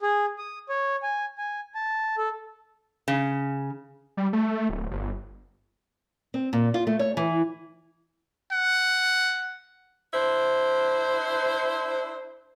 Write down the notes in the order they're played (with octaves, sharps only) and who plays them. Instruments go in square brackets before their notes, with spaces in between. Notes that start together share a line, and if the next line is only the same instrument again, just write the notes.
[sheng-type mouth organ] G#4
D#6
C#5
G#5
G#5
A5
A4
[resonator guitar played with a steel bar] C#3
[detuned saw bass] G3
A3
D1
G1
[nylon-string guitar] C4
A#2
F4
A3
C#5
E3
[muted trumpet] F#5
[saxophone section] D4 E4 C5